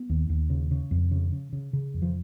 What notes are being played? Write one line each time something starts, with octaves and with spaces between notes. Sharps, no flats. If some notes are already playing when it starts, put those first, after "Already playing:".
Already playing: B3
D#2
D#2
C#3
C#3
F2
C#3
C#3
C#3
C#3
F2
F3